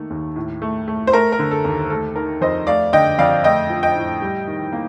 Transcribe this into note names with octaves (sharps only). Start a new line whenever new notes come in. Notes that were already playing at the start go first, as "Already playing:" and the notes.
Already playing: D#3 A3 A#3
D#2
A2
A3
A3
C5
A3 A#4
A#4
D3
A4
D#2
A3 A4
D#3 A#4
F2 C5 D#5
A3 D5 F5
D3 D#5 G5
F2 D5 F5
A3 D#5 G5
F3
D#5 G5
A2
G3
D#3
A#3